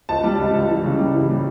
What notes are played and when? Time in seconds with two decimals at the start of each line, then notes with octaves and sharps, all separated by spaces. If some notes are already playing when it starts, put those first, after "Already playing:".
0.09 C#2 A5
0.24 G3
0.39 C#2
0.54 C#2
0.69 E3
0.83 C#3
0.99 G3
1.14 E3
1.29 G3